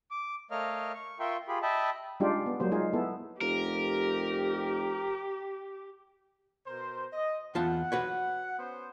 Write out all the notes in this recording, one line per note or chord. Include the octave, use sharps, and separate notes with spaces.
D6
A3 A#4 C#5 D#5 F5 F6
C#6
F4 A#4 E5 G5 C6 C#6
F4 G4 G#4 B5
D#5 E5 G5 A5 B5
G3 G#3 D4 D#4 F4 G4
B3
F#3 G3 A#3 C5
G#3 D#4 F4 G#4
B3 E4 A4
F1 G4 A#4
B2 A#4 C5
D#5
E2 F4 F#5 A5
F#4 B4 C#5
B3 C#4 C5